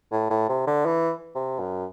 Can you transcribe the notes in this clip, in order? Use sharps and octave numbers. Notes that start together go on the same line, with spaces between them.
A2
A2
C3
D3
E3
C3
F#2